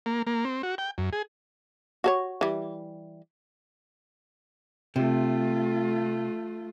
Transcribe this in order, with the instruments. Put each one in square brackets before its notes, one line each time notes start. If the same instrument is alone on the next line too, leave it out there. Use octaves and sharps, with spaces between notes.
[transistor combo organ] A#3
A#3
C4
F#4
G5
F#2
G#4
[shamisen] F#4 A4 C#5
E3 G3
[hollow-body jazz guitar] C3 [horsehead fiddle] A3 F4